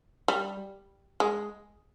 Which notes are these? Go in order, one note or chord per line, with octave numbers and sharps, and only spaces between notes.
G3
G#3